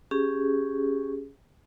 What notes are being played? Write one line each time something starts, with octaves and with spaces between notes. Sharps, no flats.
C#4 G4 G#4